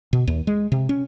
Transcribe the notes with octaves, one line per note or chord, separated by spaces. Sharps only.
B2
D#2
G#3
C3
C#4